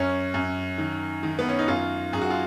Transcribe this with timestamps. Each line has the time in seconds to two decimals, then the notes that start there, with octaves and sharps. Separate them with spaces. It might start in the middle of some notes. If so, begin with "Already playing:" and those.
Already playing: F#2 C#4
0.34 F#2
0.78 D#3
1.23 D#3
1.39 B3
1.49 C#4
1.59 D#4
1.68 F#2 F4
2.13 F#2 G#4
2.22 F#4
2.30 F4